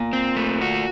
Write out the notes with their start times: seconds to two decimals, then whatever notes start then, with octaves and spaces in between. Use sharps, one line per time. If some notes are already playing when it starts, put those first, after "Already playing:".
Already playing: A#2
0.13 C4
0.36 A3
0.62 F#4